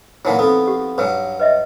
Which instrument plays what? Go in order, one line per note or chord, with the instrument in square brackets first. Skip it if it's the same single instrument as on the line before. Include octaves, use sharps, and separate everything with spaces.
[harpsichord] A#2 E3 F#3 [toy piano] D#4 E4 F#5
[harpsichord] F2 B3
[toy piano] G4
[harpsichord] G2 F#3 [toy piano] B4 G#5
[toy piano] B4 D#5 E5